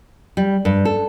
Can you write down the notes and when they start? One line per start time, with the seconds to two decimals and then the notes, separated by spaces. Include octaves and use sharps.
0.37 G3
0.65 G2
0.85 A4